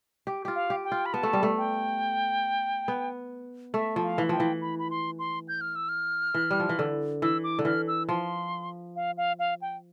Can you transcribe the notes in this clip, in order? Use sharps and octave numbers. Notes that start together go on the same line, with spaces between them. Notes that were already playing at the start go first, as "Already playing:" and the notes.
G4
F4 G4
F5
G4
G5
F4
B5
B3 A5
A3
G3
A3
G5
B3
A3 E5
F3
F5
E3
F3 G5
E3
B5
B5
C6
C6
G6
F6
E6
F6
E3
G3
F3
E3
D3
E3 E6
D6
D3
E3 F6
E6
F3 C6
F5
F5
F5
G5